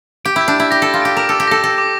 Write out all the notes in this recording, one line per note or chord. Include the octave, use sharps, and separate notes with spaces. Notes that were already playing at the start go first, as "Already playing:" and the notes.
G4 D7
E4 G6
D4
E4 G6
G4 A#6
A4 A#6
F4
G4 D7
A#4 D6
A4 D6
G4
A4 A#6
A4 A#6
D6